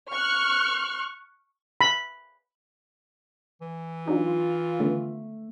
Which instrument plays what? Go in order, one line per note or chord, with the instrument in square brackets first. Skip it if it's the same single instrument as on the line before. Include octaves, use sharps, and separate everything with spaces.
[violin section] C#6 F6 F#6
[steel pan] B5
[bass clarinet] E3
[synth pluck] F#3 D4 D#4 [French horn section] F4
[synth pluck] D3 D#3 B3 [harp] A3